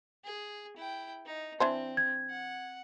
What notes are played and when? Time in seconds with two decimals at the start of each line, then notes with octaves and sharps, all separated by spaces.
0.24 G#4
0.76 E4 G5
1.26 D#4
1.60 E3 C4 D4 C5
1.97 G#6
2.30 F#5